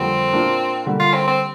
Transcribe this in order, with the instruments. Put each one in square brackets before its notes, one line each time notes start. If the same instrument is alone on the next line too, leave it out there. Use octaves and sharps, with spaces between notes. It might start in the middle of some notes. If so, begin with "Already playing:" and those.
Already playing: [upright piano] F2 D3 G3 A#3 [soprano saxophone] C4
[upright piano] A#2 A#3 D4
D3 G3 A#3
[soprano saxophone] F4
C4
C4